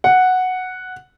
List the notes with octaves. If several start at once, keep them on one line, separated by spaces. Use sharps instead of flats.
F#5